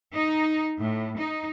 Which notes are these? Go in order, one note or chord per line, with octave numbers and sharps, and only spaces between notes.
D#4
A2
D#4